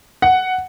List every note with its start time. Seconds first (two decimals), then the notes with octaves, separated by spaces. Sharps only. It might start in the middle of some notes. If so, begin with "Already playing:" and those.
0.22 F#5